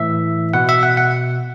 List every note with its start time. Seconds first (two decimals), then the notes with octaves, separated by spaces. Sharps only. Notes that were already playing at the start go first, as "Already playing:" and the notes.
Already playing: A2 E3 E5
0.54 B2 F#5
0.69 E5
0.83 F#5
0.97 F#5